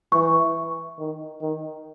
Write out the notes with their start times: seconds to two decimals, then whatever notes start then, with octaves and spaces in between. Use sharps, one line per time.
0.12 E3 C#6
0.99 D#3
1.41 D#3